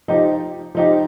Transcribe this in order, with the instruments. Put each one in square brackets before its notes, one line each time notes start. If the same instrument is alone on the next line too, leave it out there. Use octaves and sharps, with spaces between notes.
[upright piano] F3 D#4 G4
F3 D#4 G4